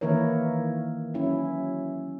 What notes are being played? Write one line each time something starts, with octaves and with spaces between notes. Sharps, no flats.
D#3 E3 A#3 E4 A#4 C#5
F#3 C#4 E4